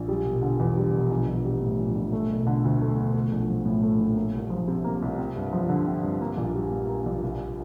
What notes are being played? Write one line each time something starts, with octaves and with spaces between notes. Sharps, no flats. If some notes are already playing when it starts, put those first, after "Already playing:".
Already playing: A#1
G3
E1
D3
E2
G3
E1
A#1
A#1
G3
A2
A#1
A#1
A3
E1
D3
D2
A3
E1
A3
A#1
F3
A2
A3
A#1
A#3
C2
F3
C3
A#3
C2
C4
G2
F3
D3
C4
G2
A#3
A#1
G3
A#2
A#3
A#1
C2